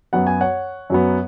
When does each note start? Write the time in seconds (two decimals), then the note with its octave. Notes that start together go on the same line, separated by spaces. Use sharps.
0.13 F#2 F#3 B3 F#5
0.27 G#5
0.41 C#5 F#5
0.90 F#2 F#3 B3